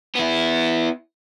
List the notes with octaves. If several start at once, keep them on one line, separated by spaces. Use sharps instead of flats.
B3 E4